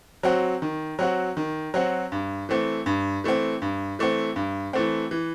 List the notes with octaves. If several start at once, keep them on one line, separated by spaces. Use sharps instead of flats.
F#3 C4 F#4
D#3
F#3 C4 F#4
D#3
F#3 C4 F#4
G2
E3 A3 C4
G2
E3 A3 C4
G2
E3 A3 C4
G2
E3 A3 C4
E3